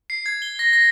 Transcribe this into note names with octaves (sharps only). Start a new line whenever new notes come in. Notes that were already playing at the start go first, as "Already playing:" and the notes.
C7
G#6
G7
A#6
A#6